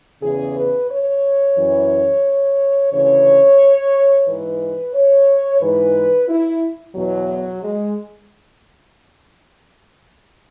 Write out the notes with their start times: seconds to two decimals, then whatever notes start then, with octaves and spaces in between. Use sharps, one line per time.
0.22 E2 C#3 E3 G#4
0.56 B4
0.90 C#5
1.57 F#2 E3
2.92 D2 C#3 E3 C#5
4.26 G#2 E3 B4
4.94 C#5
5.61 G#2 E3 B4
6.29 E4
6.95 E2 B2 F#3
7.63 G#3